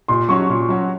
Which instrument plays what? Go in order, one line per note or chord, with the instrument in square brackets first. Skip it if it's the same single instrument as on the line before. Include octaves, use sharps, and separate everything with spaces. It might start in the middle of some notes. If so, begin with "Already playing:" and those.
[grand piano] A#2 [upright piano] C6
[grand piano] F#3 C#4 F#4 [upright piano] C#6
[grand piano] A#2
F#3 C#4 F#4